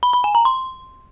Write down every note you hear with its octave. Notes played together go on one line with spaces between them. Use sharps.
B5
B5
G#5
A#5
C6